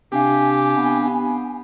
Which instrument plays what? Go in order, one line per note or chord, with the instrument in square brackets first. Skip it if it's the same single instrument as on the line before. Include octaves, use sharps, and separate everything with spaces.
[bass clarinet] C3 [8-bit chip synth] C4 D4 F5 [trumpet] G4 [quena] G#5
[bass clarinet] B3